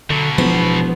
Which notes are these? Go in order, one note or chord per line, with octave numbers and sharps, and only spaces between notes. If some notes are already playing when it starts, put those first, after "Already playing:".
B2 D3 F#3
E1 F3 B3